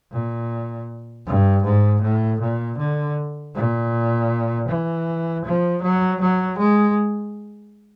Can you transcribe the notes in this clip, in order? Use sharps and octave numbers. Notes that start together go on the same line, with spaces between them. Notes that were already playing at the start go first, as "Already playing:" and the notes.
A#2
G2
G#2
A2
A#2
D3
A#2
E3
F3
F#3
F#3
G#3